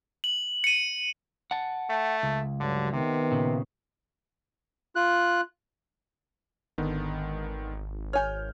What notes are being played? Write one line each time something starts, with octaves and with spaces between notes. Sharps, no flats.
F#7
C#7 D#7
F#5 A5
A3
C#2
G2 D3 F#3
C3 D#3 B3
A#2 C#3
F4 F#6
G#1 D3 D#3 B3
C#5 G#5 F6 G6